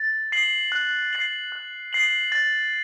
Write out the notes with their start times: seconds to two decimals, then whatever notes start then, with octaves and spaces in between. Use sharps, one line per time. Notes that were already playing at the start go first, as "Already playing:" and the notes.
Already playing: A6
0.32 C7 F#7
0.72 F#6
1.13 A6 C7 F#7
1.52 F#6
1.93 A6 C7 F#7
2.32 A6